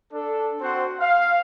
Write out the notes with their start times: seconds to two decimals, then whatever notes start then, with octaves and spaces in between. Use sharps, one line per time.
0.13 D4 A4
0.61 C4 F#4 C5 F#5
1.00 F5